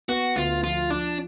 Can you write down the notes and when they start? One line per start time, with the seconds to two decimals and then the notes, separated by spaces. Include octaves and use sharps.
0.09 B3 F#4
0.36 D2 F4
0.63 F3 F4
0.90 F3 D4